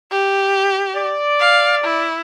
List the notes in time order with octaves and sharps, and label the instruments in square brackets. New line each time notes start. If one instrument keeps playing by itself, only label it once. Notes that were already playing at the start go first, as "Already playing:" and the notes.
[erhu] G4
[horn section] D5
[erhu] F5
E4